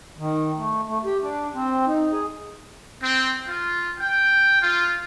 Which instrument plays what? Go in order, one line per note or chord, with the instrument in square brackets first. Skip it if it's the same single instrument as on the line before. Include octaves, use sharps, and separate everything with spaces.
[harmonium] D#3
A3
A3
G4
D4
C4
D#4
G#4
[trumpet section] C4
F4
G5
F4